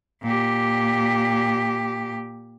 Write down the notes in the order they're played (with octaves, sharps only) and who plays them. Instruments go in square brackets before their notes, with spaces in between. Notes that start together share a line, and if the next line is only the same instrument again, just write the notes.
[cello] A#2 G4